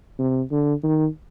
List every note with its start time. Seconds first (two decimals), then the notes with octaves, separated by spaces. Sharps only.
0.19 C3
0.51 D3
0.83 D#3